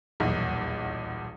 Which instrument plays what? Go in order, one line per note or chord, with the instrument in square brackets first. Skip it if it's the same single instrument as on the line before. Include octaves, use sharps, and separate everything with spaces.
[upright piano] D#1 B1 E2